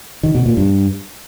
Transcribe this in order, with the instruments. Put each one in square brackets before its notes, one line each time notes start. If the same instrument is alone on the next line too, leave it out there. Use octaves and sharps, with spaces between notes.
[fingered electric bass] D#3
B2
A#2
G2